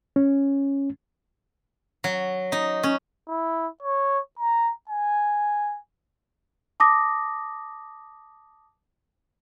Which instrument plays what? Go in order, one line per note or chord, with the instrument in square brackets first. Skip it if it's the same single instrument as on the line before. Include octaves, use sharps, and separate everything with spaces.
[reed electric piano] C#4
[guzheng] F#3
D#4
C#4
[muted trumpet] E4
C#5
A#5
G#5
[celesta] A5 D6 D#6 A#6